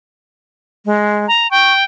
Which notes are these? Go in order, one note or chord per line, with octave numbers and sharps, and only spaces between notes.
G#3
A#5
G5 C#6